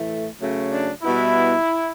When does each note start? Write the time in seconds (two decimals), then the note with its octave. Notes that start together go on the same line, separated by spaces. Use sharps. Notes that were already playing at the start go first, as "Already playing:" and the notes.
Already playing: A2 E3 A3
0.39 C#3 F#3 A3
0.71 D4
1.02 B2 G3 B3 E4